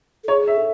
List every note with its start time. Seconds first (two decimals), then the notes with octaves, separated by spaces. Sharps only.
0.24 A4
0.28 G#4 C#5
0.47 E5
0.56 A4